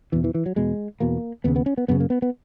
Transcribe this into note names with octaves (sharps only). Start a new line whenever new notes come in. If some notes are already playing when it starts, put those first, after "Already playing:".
E2 B2 E3
E3
E3
F#3
E2 B2 G#3
E2 B2 A#3
D#2 C#3 B3
B3
C#4
B3
F#2 C#3 B3
A#3
B3
B3